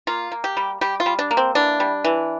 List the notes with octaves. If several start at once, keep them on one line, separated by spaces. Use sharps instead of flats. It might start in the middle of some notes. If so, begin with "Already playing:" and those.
A#3 F4
A#3
G4
G3
G3 G4
F4
G3
D4
A#3
C4
E3 D4
G3
E3